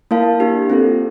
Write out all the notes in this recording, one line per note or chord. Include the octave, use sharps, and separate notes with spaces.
A#3 E4 A#4 F5 A5
A#3 D4 G4
C4 F4 A4